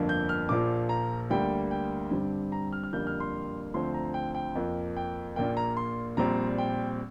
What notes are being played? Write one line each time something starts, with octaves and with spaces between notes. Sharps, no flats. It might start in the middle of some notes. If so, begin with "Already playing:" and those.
Already playing: G1 F2 D3 F3 A#3
G6
F6
A#1 A#2 F3 A#3 D6
A#5
D2 D3 G3 A#3 G5
G5
G2 D3 G3 C4
A#5
F6
F6
F2 D3 G3 A#3 G6
F6
C6
D2 D3 F3 C4 C6
A#5
G5
G5
F2 F3 A#3
G5
A#1 A#2 A#3 G5
A#5
C6
A#1 A#2 G3 C4 A#5
G5